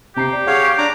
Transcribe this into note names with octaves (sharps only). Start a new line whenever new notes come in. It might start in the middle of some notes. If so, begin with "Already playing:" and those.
C3 G4 A#5 C7
D5
G#4 C#5 F5 F#5 D6
D7
D4 A#5 D6